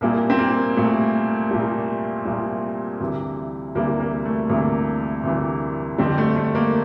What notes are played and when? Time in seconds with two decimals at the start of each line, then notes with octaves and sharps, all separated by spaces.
0.01 C2 A#2 G3 A#3
0.30 C4
0.39 A#3
0.76 C2 A#2 G3 A3
1.51 C2 A#2 G3
2.25 C2 A#2 G3
3.00 D2 C3 E3 G3
3.75 D2 C3 E3 G3 A#3
4.00 A#3
4.25 A3
4.49 D2 C3 E3 G3 A#3
5.24 D2 C3 E3 G3
5.98 F2 D3 G3 C4
6.18 A3
6.36 A3
6.55 A#3